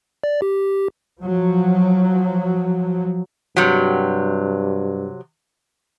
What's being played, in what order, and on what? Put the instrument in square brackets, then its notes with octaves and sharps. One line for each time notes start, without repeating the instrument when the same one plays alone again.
[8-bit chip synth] D5
G4
[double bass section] F3 F#3
[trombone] G2 [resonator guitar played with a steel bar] C3 F#3